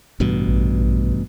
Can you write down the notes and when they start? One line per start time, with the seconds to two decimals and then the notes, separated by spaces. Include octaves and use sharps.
0.20 A1 G2 B2
0.48 A#1